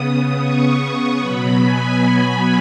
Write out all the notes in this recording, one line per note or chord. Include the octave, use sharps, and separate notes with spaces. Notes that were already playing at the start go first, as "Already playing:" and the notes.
Already playing: C#3 B3 D#6
C#6
C#6
B2 F#3 B3 B5
G#5
G#5